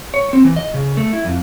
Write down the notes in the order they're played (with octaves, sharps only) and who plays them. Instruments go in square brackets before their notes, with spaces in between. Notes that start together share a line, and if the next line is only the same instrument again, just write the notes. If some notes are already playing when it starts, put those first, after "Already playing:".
[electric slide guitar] C#5
C4
E3
D#5
C#3
A3
E4
F2